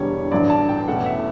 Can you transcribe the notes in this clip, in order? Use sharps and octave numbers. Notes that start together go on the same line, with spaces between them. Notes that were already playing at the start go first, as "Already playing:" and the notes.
Already playing: E1 E2 D3 G3 C#5
A1 G2 D3 F#3 D5
A5
G5
E2 B2 A3 C#4 F#5
E5